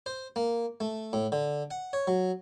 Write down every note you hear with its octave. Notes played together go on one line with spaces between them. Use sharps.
C5
A#3
A3
A2
D3
F#5
C#5
F#3